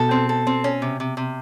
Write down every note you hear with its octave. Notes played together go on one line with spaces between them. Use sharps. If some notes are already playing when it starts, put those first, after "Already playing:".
Already playing: B2 A4
C4
A4
C4
C#4
C3
C3
C3